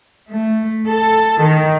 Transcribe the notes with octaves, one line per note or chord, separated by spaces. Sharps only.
A3
A4
D#3